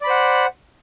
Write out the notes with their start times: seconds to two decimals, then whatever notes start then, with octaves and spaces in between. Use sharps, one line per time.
0.01 D5
0.04 B5
0.07 C5
0.10 F#5